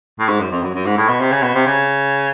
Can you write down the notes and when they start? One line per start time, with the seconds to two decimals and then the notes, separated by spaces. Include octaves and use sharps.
0.19 A2
0.28 G#2
0.40 F#2
0.51 F2
0.63 F#2
0.74 F#2
0.86 G#2
0.97 A2
1.09 B2
1.20 C3
1.31 C#3
1.43 B2
1.54 C3
1.66 C#3